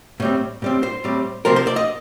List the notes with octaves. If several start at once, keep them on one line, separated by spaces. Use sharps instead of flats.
A2 G3 C4
A2 G3 C4
C5
A2 G3 C4
C3 F3 C4 A#4
C5
D5
D#5